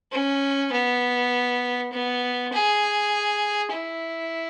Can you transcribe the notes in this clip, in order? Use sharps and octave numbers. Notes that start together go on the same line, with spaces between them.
C#4
B3
B3
G#4
E4